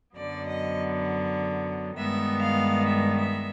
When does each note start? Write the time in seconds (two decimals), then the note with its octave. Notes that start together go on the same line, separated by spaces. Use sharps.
0.16 F#2 D3 F#3 B3 D5
0.46 D#5
1.96 G2 D#3 G#3 B3 E5
2.41 F5
2.87 E5
3.17 E5